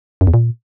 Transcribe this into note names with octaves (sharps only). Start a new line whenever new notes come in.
F#2
E2
A#2